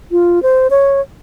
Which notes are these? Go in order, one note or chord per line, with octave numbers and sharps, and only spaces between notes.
F4
C5
C#5